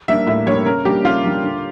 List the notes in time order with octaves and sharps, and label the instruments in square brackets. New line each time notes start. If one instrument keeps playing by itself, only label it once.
[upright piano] G3 A#3 D4 [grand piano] E5
[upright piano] A2 [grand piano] E5
[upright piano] G3 A#3 D4 [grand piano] C#5
[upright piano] C#3 [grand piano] A#4
[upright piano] G3 A#3 D4 [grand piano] G4
[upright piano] C#3 [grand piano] F4
[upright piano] G3 A#3 D4
D3